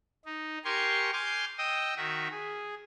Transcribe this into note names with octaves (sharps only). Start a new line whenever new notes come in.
D#4
G4 A#4 G#5 C6 C#6
G#5 C6 D6 F6 G6
D#5 G5 D#6 E6
D#3 F#4 E5
G#4